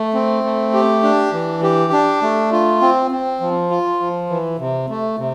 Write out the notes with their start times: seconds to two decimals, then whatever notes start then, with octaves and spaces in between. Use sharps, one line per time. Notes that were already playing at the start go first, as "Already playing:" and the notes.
Already playing: A3
0.14 C4
0.44 A3
0.73 G4
1.03 D4
1.33 E3
1.62 G4
1.92 D4
2.22 A3
2.52 F4
2.81 C4
3.11 C4
3.40 F3
3.70 F4
4.00 F3
4.30 E3
4.59 C3
4.89 A3
5.19 C3